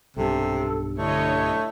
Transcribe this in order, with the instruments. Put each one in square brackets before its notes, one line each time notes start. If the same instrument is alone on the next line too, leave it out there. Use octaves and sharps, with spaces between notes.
[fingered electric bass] B1 G2 [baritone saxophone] C3 [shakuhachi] A4
[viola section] D3 C#5 D#5 [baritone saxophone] A3 [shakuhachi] E4